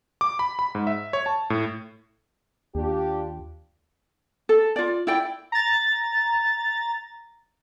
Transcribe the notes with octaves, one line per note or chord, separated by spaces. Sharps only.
D6
B5
B5
G#2
E5
C#5
A5
A2
D#2 D4 F4 G4
A4
F4 D5
E4 D5 G5
A#5 A6